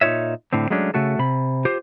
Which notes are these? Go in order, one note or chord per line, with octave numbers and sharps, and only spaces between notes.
A#2 D#4 F4 F#4 C#5 E5
A2 D3 C4
F#3 G#3 A3 C#4 D4
C#3 A3 F#4 A4
C3 B5
F4 G4 C5